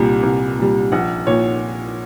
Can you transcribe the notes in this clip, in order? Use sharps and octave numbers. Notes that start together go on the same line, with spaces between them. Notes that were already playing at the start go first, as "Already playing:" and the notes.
Already playing: C2 A#2 G3
C2
A#2 G3
A#1 F#5
A#2 C#5